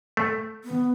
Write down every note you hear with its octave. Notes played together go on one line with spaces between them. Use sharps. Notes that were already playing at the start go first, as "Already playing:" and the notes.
A3
B3